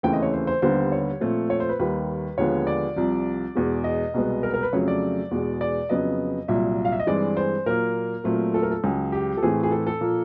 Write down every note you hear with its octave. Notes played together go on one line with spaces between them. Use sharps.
D#2 C#3 E3 A3 C4 G5
D#5
C#5
C5
C5
D#2 D3 G3 B3 C5
C#5
A#2 F3 A3 C4
C#5
C5
B4
D#2 D#3 G3 B4
D#2 D3 F3 G#3 B3 C#5
D5
C2 C3 F3
E2 B2 G#3
D#5
C2 B2 G#3 B3
A#4
A#4
B4
F2 C#3 F#3 A3 C#5
D5
E2 B2 G#3
D5
F2 C#3 F#3 B3 D#5
C2 A#2 F#3 E5
F5
E5
D#5
G2 E3 G#3 C4 D5
C5
A#2 F#3 A#3 A#4
A#2 F#3 A3 C4
A4
A#4
A4
C#2 C#3 F#3 G#4
G4
A4
A2 E3 A3 C4 G#4
G#4
A4
A4
A#2 F3 A#3